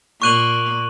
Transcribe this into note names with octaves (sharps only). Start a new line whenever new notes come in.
A#2 A#3 C#6 F#6 D#7 F#7